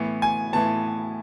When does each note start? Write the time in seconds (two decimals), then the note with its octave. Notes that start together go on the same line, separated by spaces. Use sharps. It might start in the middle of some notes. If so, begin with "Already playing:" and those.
Already playing: A2 E3 B3
0.22 G#5
0.53 A2 E3 B3 A5